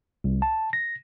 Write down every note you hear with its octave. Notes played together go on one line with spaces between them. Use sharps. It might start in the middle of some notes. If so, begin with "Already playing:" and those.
C2
A5
A#6